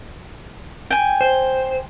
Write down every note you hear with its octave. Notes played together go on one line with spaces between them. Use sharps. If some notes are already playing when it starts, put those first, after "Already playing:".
G5 G#5
C5